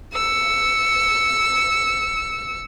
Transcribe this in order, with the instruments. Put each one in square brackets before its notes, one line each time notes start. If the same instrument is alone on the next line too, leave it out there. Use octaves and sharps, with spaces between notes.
[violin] E6 C#7